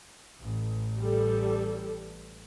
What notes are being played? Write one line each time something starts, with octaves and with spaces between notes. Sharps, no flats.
A1
G3 A4